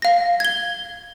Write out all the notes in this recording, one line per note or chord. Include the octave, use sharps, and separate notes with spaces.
F5 A#6
G#6 G7